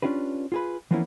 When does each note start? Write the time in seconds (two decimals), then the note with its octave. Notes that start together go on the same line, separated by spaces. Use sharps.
0.02 C#4 D4 F4 G4 B4
0.52 F4 G#4 B4
0.91 E3 F3 A#3 B3 C#4 E4